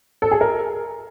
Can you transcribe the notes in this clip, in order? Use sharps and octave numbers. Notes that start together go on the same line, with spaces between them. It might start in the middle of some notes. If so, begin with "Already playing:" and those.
A4
G#4
A#4